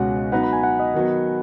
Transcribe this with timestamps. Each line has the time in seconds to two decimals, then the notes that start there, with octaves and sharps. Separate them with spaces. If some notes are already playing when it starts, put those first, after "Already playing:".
Already playing: C#2 B2 G#3 C#4 F#4 F#5
0.32 F#3 B3 D#4 B4 F#5
0.43 B5
0.53 G#5
0.63 F#5
0.80 D#5
0.94 D#3 F#3 B3